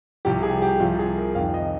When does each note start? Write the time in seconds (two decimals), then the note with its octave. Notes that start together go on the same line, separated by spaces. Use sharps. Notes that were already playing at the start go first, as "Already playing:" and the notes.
0.25 C2 C3 F3 G4
0.43 G#4
0.62 G4
0.80 C2 C3 F3 F4
0.99 G#4
1.18 A#4
1.35 F2 C3 D#3 F5
1.54 D#5